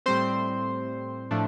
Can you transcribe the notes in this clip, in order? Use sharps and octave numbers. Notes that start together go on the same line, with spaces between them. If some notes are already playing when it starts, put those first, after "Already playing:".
A2 G3 C4 C5 C6
A2 F3 A3 D4